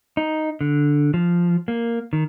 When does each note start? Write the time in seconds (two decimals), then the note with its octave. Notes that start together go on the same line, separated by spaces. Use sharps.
0.17 D#4
0.61 D3
1.14 F3
1.68 A#3
2.13 D#3